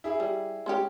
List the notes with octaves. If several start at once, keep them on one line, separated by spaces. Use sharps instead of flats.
E4 G#4
G3
G#3 C#4 G4